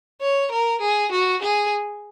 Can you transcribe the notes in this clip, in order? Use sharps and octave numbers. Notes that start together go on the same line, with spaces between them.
C#5
A#4
G#4
F#4
G#4